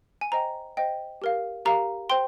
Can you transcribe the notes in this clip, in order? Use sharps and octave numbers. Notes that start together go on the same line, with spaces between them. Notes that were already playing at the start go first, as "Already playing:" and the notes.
G#5
C5 D#5 G5 A#5
C5 D#5 G5
G4 A#4 F5
G4 A#4 F5 A#5
C5 G5 C6